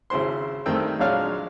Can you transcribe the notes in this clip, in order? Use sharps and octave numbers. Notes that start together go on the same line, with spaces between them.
G#1 C#3 E4 C5 C6
G2 D#3 A3 C4 G5 E6
A#1 F#3 G#3 D4 C#5 F5